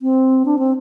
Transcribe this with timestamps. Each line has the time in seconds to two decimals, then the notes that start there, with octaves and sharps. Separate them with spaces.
0.02 C4
0.45 D4
0.59 C4